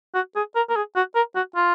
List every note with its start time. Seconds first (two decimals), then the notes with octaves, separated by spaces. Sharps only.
0.15 F#4
0.36 G#4
0.55 A#4
0.69 A#4
0.76 G#4
0.96 F#4
1.15 A#4
1.35 F#4
1.56 F4